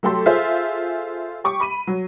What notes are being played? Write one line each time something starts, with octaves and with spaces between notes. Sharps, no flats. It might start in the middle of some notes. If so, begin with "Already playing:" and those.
F#3 A3 G4 A4 C6
F4 G#4 A4 C5 E5
G4 C#6 D6
B5 D#7
F#3